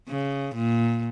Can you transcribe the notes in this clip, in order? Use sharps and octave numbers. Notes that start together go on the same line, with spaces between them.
C#3
A#2